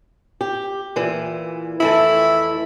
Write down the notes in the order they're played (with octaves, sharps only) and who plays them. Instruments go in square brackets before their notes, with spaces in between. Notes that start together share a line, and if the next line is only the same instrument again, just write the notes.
[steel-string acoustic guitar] G4
A#2 E3
[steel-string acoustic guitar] F2 E3 A3 [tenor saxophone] E4